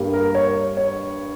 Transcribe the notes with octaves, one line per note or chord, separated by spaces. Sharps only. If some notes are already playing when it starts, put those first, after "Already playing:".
Already playing: G2 G3 A#3
A#4
C#5
C#5